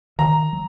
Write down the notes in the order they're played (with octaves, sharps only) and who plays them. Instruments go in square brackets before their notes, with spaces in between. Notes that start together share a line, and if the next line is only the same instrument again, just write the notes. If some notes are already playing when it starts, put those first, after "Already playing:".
[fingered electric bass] D#3 [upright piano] A#5
[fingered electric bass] F#3